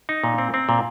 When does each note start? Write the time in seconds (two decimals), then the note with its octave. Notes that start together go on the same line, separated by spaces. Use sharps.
0.09 D#4
0.24 A#2
0.38 C4
0.54 C4
0.69 A#2